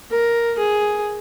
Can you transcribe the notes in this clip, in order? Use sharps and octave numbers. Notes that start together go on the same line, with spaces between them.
A#4
G#4